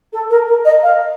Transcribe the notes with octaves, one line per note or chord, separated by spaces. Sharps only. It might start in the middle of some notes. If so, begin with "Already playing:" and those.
A4
A#4
A#4
D#5
F5